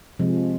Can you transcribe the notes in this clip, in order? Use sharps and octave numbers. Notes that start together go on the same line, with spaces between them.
C3 F3 G#3